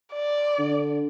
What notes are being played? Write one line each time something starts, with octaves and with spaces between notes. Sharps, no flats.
D5
D3